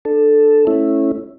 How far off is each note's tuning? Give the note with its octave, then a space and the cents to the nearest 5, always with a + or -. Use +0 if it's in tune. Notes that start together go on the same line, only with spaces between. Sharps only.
D4 +30 A4 +0
A3 +0 C#4 -15 E4 +0